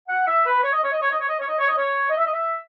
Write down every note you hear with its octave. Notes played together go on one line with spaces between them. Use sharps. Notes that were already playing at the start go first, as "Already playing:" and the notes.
F#5
E5
B4
C#5
D#5
C#5
D#5
C#5
D#5
C#5
D#5
C#5
D#5
C#5
D#5
C#5
D#5
E5
D#5
E5